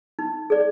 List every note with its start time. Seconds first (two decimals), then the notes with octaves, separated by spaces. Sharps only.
0.19 D#4
0.50 G#4 D5